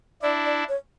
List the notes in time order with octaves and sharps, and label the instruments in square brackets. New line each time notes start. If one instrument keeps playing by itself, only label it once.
[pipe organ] D4 E4 [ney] D5
[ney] D5
C#5